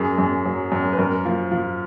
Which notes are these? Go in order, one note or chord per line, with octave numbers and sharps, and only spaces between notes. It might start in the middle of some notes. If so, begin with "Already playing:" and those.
Already playing: F#2 G#4
F#2
F#3
F#2
B4
F#2 A#4
F3
F3